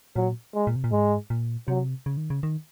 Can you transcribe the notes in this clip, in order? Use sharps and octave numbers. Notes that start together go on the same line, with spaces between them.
A#2 F#3
G#3
A#2
C3
A#2
G#2 G#3
A#2
C3 F#3
C#3
D#3
C#3
D#3